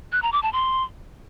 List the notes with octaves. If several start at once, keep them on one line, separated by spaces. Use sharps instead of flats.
F#6
A#5
D6
A5
C6